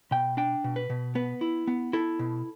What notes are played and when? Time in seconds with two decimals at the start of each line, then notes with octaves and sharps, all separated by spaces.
0.11 B2 G5
0.37 D4 G5
0.64 B2
0.76 B4
0.90 B2
1.15 B3 B4
1.41 E4
1.68 B3
1.93 E4 A4
2.19 B2